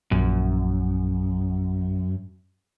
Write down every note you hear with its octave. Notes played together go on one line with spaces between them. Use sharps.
A#1 F#2